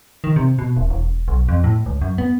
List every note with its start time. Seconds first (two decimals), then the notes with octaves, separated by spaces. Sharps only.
0.24 D#3
0.36 C3
0.59 B2
0.77 D#1
0.90 E1
1.28 B1
1.49 F2
1.64 A2
1.86 C#2
2.02 F#2
2.18 B3